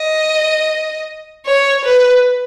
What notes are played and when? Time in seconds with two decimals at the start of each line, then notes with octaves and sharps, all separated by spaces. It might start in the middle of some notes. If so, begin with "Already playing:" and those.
Already playing: D#5
1.46 C#5
1.85 B4